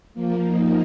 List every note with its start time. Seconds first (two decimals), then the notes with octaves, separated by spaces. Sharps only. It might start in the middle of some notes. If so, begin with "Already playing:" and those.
0.14 F3 A#3
0.46 A#3 D#4